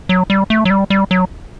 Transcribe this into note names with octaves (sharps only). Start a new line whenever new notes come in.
F#3
G3
A3
F#3
G3
G3
F#3